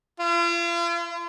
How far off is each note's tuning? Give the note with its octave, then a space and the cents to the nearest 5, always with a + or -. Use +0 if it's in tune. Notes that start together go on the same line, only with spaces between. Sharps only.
F4 -40